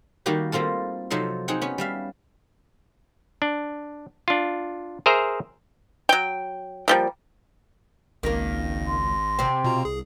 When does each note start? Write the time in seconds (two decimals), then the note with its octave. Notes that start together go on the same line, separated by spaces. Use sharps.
0.26 D#3 G3 A#3 D#4 F#4 G4
0.52 G3 A#3 C4 F4 A4
1.10 C3 F3 F#3 D#4 A4 C6
1.48 C4 D#4 G#4 F#5 G5
1.61 B3 C#4
1.78 G3 E5 F5
3.42 D4
4.28 D4 F4
5.06 G#4 A#4 C5 E5 A#5
6.09 F#3 G5
6.88 F3 G3 A#3
8.23 G#1 C#2 D#3 A#3 A#6
8.87 C6
9.39 C3 C4
9.64 B2 F4 A#5
9.85 C2 G#4